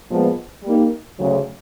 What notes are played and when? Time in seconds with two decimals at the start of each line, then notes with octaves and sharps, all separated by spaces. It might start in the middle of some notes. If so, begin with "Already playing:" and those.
0.09 A#2 F3 G#3 B3
0.63 G3 A#3 D#4
1.18 D2 C#3 F#3